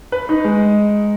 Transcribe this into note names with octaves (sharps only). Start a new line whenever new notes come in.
B4
D#4
G#3